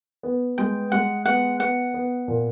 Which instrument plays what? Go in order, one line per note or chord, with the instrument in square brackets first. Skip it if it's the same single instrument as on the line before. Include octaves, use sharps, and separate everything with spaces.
[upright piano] B3
[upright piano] G#3 [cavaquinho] G5
[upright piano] G#3 [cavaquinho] F#5
[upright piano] B3 [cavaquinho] F#5
[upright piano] B3 [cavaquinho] F#5
[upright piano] B3
A#2